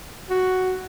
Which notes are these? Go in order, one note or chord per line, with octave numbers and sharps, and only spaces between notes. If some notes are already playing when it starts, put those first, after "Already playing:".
F#4